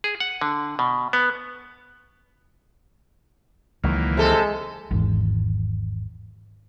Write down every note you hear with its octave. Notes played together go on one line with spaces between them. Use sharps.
G#4
F#5
D3
B2
B3
C#2 D#3 E3 F#3 A#3
C3 G#3 A4
G#1 E2